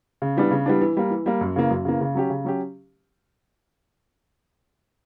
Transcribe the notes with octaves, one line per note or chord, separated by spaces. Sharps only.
C#3
E3 G3 B3 D4
C#3
E3 G3 B3 D4
E3
G3 A#3
E3
G3 A#3
F#2
C#3 E3 A#3
F#2
C#3 E3 A#3
C#3
F#3 C#4 G4
C#3
F#3 C#4 G4